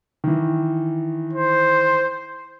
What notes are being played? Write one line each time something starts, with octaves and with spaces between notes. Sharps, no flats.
D#3 E3
C5